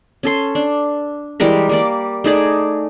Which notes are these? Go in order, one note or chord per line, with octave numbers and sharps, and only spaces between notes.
C#4 A4 C6
D4
E3 G3 G#3 A#4
G3 A#3 D5
A3 D#4 G#4 D5